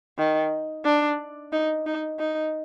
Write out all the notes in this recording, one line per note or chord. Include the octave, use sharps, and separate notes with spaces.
D#3
D4
D#4
D#4
D#4